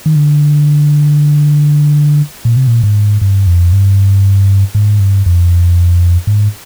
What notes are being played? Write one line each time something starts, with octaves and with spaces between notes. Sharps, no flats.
D#3
D3
A#2
C3
A#2
G#2
G2
F2
G2
G#2
G2
F2
G#2